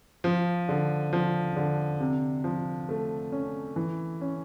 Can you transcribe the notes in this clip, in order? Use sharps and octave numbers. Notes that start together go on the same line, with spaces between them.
F3
D3
F3
D3
C3
F3
A3
C#4
E3
C#4